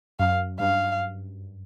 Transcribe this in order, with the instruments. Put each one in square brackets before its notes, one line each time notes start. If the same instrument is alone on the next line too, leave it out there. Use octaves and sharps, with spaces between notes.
[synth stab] F#2 [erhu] F5
[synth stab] G2 [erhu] F5